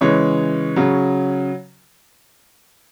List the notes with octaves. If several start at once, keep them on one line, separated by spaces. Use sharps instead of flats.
C#3 E3 G#3 C#5
C#3 F#3